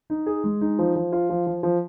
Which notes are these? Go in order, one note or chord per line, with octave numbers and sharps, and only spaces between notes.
D#4
G#4
G#3
D#4
F3
F3
F4
F3
F3
F3